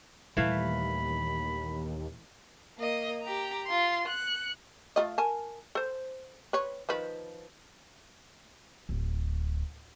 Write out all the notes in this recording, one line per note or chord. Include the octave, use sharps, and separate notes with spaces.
D#2 A#2 E3 G3 A3 F5 B5
A#3 D#5
G4 A#5
F4 C6
F#6 C#7
A3 F4 D#5
A#4 G#5 A5
A4 C5
B4 C#5
D#3 F3 B4
D1